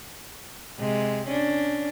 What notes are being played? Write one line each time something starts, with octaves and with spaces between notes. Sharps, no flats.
C3 G#3
C#4 D4